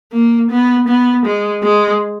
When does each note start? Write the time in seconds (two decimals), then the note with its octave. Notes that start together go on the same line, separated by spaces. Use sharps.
0.13 A#3
0.51 B3
0.88 B3
1.25 G#3
1.64 G#3